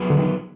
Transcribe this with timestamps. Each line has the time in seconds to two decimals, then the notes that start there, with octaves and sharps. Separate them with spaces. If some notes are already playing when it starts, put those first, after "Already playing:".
Already playing: F#3 B3 F4 G#4 B4
0.10 D3
0.19 D#3